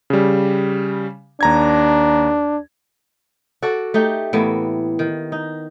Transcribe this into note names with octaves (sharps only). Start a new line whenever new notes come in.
C#3 G3
D#2 D4 A#5 G#6
F#4 A4 D5
A3 D#4 G4
A2 E3 A#3 B3
D#3
D#4